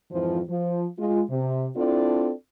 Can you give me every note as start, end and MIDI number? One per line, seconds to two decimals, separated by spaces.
0.12 0.41 41
0.12 0.41 44
0.12 0.41 52
0.12 0.41 53
0.49 0.87 53
0.99 1.22 56
0.99 1.22 65
1.30 1.68 48
1.77 2.31 60
1.77 2.31 62
1.77 2.31 64
1.77 2.31 65
1.77 2.31 69
1.77 2.31 74